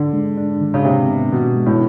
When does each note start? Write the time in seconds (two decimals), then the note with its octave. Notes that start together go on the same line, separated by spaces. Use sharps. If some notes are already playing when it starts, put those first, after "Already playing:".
Already playing: D3 D4
0.13 G#3
0.38 D4
0.61 D#3
0.74 C#3
0.85 C3 D4
1.08 B3
1.32 B2 D#3
1.56 G#3
1.66 A2